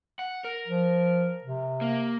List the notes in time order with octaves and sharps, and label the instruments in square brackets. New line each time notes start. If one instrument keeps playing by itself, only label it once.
[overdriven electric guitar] F#5
A#4
[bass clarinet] F3
C3
[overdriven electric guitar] A#3